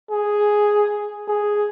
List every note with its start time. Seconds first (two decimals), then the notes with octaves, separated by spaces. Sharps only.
0.10 G#4
1.28 G#4